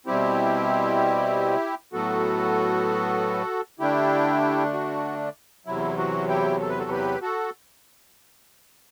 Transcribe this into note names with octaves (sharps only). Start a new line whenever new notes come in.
B2 G3 C4 E4 G4
A2 F#3 B3 F#4 A4
D3 A3 D4 E4 G4
F#4
E2 C3 F#3 E4
F#4
E4 G4
A4
B4
F#4 A4
G4 B4
F#4 A4